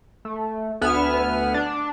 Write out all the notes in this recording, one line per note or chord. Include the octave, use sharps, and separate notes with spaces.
A3
D2 D3 B3 E5 G#5 F6
D4